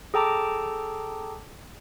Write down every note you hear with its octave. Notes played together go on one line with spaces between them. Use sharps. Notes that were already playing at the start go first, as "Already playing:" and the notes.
G#4 A4 G5 A5 A#5 D6